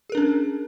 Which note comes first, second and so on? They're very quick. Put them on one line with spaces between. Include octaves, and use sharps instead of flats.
G#4 A#4 D4 C#4